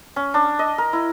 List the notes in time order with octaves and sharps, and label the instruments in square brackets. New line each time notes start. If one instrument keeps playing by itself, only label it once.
[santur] C#4
D4
D#5
A#4
E4